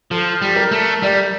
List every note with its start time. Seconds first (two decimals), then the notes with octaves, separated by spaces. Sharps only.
0.11 F3 A4
0.42 G3
0.56 A#4
0.72 A3
1.02 G3 D5